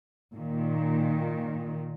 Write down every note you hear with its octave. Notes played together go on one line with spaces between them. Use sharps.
A#2 D#3